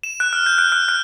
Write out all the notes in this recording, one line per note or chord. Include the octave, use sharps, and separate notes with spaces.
E7
F#6
F6
G6
F#6
F6
F#6